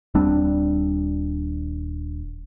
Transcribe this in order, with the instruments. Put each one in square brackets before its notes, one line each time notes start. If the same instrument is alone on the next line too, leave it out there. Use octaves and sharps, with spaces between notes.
[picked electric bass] D#1 G3 C4 D4